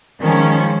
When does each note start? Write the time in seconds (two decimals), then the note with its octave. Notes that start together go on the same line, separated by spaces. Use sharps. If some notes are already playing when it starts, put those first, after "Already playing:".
0.21 D#3 F3 G#3 C#4